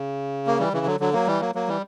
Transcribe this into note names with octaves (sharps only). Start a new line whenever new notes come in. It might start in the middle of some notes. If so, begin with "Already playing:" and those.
Already playing: C#3
A#3
E3 G3
C#3 E3
D3 F#3
D3 F#3
F#3 A#3
E3 G3
F#3 A#3
F#3 A#3
E3 G3